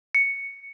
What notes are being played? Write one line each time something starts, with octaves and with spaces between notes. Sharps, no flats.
C#7